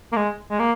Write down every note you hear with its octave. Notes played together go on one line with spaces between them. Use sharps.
A#3
G#3
G#3
A#3